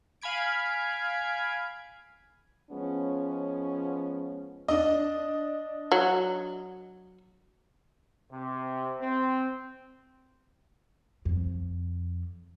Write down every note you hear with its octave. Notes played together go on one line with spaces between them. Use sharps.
F5 G#5 B5 G#6 D7
F3 G#3 B3 C#4
D4 D#5
F#3
C3
C4
F2